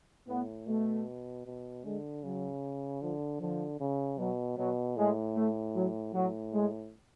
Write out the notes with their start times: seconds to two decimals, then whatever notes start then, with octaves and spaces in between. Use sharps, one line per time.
0.28 A2 B3
0.67 B2 A3
1.46 B2
1.84 D3 G#3
2.24 C#3 F#3
3.02 D3 F3
3.40 D3 F3
3.80 C#3
4.18 B2 F#3
4.57 B2 F#3
4.97 A2 G#3
5.35 A3
5.75 F#3
6.14 A2 F#3
6.54 G#3